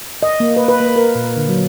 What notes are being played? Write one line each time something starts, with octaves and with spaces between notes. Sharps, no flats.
D#5
A#3
B4
B4
A#3
A#4
A#2
D3
F#3